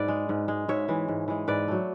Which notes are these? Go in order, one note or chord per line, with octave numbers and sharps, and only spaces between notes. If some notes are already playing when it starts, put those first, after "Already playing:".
Already playing: G#2 B4 D5
G#3
G#2
G#3
G#2 C#5 E5
E3 G#3
G#2
E3 G#3
G#2 B4 D5
F#3 A3